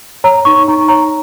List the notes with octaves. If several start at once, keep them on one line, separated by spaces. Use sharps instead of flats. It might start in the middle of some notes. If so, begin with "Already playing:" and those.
C#5 A#5
D#4 C#6
D#4 A#5
C#5 A#5